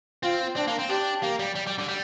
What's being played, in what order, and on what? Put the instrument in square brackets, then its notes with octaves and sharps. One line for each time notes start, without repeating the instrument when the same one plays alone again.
[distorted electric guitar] C4 [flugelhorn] F4
[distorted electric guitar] C4 [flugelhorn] D4
[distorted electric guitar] A#3
C4
[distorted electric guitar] D4 [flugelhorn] G4
[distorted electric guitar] A#3
G3
G3
G3
D3
G3